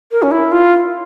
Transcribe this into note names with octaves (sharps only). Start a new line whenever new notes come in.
A#4
C#4
E4
F4